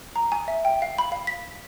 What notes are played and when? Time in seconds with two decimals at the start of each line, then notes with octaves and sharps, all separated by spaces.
0.16 A#5
0.32 G#5
0.48 E5
0.65 G5
0.82 F5
0.98 B5
1.12 F5
1.27 B6